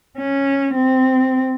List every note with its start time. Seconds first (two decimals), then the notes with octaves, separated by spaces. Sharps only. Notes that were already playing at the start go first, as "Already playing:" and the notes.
0.17 C#4
0.74 C4